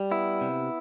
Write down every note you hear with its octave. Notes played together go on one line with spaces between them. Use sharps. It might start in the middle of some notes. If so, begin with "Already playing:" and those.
Already playing: G3
B3 E4
C3